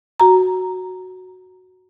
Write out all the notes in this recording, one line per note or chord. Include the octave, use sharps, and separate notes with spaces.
F#4 A#5